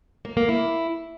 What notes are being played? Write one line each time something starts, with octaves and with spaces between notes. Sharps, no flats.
A#3
A#3
E4